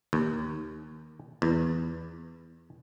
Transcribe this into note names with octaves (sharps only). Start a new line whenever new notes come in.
D#2
E2